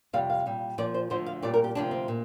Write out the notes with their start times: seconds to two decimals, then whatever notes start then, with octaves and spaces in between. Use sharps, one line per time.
0.13 F2 C3 G3 F5
0.30 F5
0.46 A#2 G3
0.78 A#2 F3 D5
0.94 C5
1.10 D2 D3 F3 C5
1.26 F5
1.43 A#2 G3 D5
1.54 A#4
1.64 G4
1.75 D2 C3 F3 D4
1.91 C4
2.08 A#2